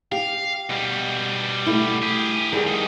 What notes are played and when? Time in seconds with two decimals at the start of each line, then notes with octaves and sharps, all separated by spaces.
0.12 G4 F5
0.70 B2 G3
1.66 A3 E4
2.03 G4 G#4
2.52 E2 D#3 G3 G#4
2.67 F3 D#4